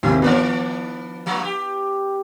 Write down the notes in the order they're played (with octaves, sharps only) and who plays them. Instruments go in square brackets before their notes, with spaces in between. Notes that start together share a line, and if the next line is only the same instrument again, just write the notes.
[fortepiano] D#2 G#2 C3 [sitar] E4
[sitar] D#3 F3 D4 [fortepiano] B3 D5
[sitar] G2 F3 A#3
G4